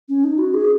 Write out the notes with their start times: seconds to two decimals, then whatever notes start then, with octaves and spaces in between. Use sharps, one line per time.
0.09 C#4
0.24 D#4
0.38 F#4
0.54 G#4